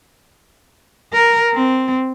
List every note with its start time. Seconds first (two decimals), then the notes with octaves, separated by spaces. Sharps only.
1.13 A#4
1.54 C4